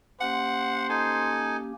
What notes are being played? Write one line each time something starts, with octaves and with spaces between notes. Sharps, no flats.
A#3 C#4 G4 C5 F#5
D#4 A4 G#5